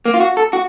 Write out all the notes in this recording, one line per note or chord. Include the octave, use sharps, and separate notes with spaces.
A#3
F4
F#4
A4
F#4